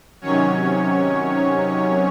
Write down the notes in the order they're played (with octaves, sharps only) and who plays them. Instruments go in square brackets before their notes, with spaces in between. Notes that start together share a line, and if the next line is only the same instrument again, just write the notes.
[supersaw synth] C3 D#3 F#3 C#4 C#5